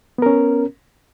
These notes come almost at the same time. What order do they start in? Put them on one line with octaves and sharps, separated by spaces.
B3 A#4 C#4